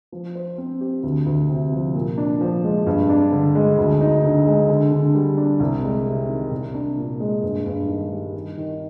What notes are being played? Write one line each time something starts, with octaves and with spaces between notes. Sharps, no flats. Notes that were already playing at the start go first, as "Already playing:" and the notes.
F3
C5
C4
G4
D2
D2
C3
F3
A#2
D4
F3
G#3
G2
D4
D3
G#3
D2
D#4
D3
G#3
D3
D3
G3
D4
C2
G#3
C3
D#3
C2
D4
A#2
G#3
G2
G2
D#3
G3
D#3
D#3